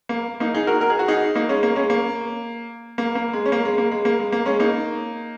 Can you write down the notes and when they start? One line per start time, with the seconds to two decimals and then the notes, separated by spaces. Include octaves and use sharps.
0.09 A#3
0.40 A#3 D#4
0.54 D#4 G#4
0.67 F#4 A#4
0.81 A#4
0.90 G#4
0.99 F#4
1.08 D#4 G#4
1.35 A#3 D#4
1.49 G#3 C#4
1.63 A#3
1.75 G#3 C#4
1.90 A#3
2.98 A#3
3.15 A#3
3.33 G#3
3.46 C#4
3.52 A#3
3.65 G#3
3.78 A#3
3.91 G#3
4.05 A#3
4.19 G#3
4.32 A#3
4.46 G#3 C#4
4.60 A#3 D#4